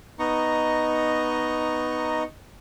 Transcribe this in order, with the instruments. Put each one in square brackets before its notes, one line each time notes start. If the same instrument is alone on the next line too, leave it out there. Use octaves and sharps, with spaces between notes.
[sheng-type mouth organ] B3 D#4 D#5 A#5 C#6